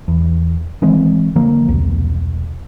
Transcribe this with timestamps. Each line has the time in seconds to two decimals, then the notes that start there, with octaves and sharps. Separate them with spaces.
0.08 E2
0.82 D#3 E3 G#3 C4
1.36 D3 F3 A#3
1.68 E1 C2